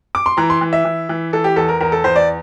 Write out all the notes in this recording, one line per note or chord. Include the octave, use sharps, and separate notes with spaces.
D6
C6
E3 A#5
C6
E3
E5
E3
E3
E3 A4
G4
E2 A4
A#4
E2 A#4
A4
E2 C5
D5